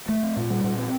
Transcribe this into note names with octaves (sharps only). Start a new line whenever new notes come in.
A3
C4
A#2
G3
A#2
C4